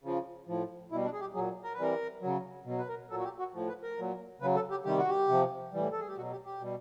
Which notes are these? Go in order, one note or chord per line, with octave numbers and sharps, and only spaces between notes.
C#3 F3
A2 F3
B2 G3 E4
D4
G#4
G4
A#2 F#3 G#4
A#4
B4
C3 E3 G3 A#4
C#3 F#3
B2 F#3
B4
A#4
A#2 F#3 A4
F#4
G4
F#4
A2 F3
B4
A#4
A#2 F#3
C#3 F#3 B4
A4
G4
C3 D#3 G3 G4
F#4
G4
C3 F3
A2 E3 G3
A4
G#4
G4
B2 F#3 F#4
G4
G4
B2 G3